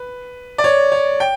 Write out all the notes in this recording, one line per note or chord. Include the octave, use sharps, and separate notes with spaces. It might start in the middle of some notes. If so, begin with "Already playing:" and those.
Already playing: B4
D5
C#5
C#5
G5